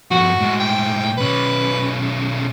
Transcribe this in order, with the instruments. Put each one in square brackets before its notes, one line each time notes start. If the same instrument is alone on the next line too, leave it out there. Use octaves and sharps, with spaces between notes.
[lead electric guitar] G2 F3 [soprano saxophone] F#4
[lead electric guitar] A2 G#3
[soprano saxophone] G5
[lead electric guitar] B1 C#4 [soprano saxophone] B4